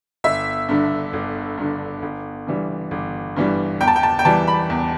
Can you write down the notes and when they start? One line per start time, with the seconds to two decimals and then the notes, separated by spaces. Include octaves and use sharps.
0.24 G1 E5
0.68 G2 D3
1.13 G1
1.57 G2 D3
2.02 G1
2.47 G2 E3 G3
2.91 G1
3.36 G2 E3 G3
3.81 E2 G5
3.87 A5
3.96 G5
4.03 A5
4.19 G5
4.25 E3 G3 A5
4.48 B5
4.70 E2